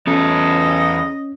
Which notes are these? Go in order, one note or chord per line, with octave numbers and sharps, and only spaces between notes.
E2 C#4 A4 D#5